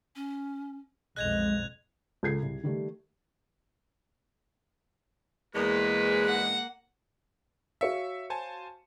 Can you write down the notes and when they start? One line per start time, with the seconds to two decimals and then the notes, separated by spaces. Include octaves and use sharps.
0.15 C#4
1.16 B1 F2 G#3 D#5 F#6 G#6 F7
2.23 C#2 A4 G#6 C7
2.42 C2
2.63 D#3 G3 A3
5.55 E2 G#3 A#3 B4
6.27 F#5
7.81 F#4 C#5 E5 F5 C#7
8.30 C5 G#5 A5